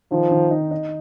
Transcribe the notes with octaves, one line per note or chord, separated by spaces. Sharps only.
D#3 F3
D#3
D#4
D#4